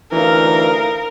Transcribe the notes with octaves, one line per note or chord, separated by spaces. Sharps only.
D2 E3 D#4 A#4 F5